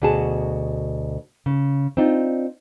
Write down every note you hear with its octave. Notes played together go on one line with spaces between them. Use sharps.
D2 B2 F#4 G#4 A5
C#3
C4 D4 D#4 F4